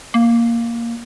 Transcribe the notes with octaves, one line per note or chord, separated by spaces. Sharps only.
A#3